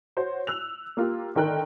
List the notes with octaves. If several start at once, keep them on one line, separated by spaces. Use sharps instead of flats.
F#4 C5 C#5
E6 F#6 F7
A#3 F4 G4
D3 D#3 A#4 G5 F#6